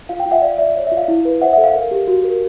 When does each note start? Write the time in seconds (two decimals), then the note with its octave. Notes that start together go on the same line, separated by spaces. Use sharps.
0.09 F4 F5
0.20 F5 G5
0.26 F4
0.31 E5 F#5
0.42 D5 F5
0.58 D5 E5
0.76 C#5
0.87 F4 E5
0.97 F5
1.08 E4
1.25 B4
1.41 C5 E5 F#5
1.53 A4 E5 F#5
1.64 F5
1.74 A#4 F5
1.91 G4
2.07 F#4
2.24 A#4